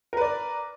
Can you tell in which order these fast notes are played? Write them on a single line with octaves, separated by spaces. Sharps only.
A#4 B4 D5